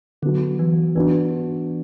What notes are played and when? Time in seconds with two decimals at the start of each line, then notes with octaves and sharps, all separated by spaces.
0.22 D3 F#3 B3 F#4
0.59 E3
0.95 E3 B3 D4 F#4